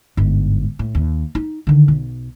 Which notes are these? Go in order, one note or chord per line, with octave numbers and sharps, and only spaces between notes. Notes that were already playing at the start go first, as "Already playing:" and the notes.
G1 G#2
A2
D#2
D#4
D3 D#3
B1